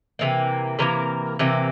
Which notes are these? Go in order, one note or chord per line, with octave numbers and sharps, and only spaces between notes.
C3 E3 A#3
C3 E3 A#3 A#4
C3 E3 A#3